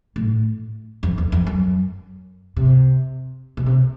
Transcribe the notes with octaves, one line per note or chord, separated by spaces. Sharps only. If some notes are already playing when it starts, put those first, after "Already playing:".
A2
F2
E2
F2
F#2
C3
B2
C3